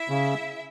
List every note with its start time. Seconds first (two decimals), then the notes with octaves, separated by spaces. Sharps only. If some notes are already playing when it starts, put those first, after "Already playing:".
Already playing: E4 E5
0.09 C#3